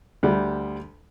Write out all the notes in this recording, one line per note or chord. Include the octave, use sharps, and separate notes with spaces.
D2 G3